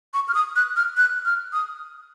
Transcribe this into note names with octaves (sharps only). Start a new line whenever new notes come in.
C#6
F6
D#6
F#6
F6
F#6
F6
D#6